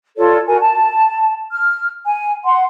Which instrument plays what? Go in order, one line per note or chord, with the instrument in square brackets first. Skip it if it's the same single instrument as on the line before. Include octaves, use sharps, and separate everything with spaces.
[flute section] F4 A4 C#5 D5
F#4 A#4 G#5
A5
F6
G#5
F#5 C6